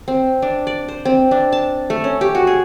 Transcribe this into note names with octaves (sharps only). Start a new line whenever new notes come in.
C4
D4
D5
C5
C4
D4
A5
A3
C#4
G4
F#4
G#4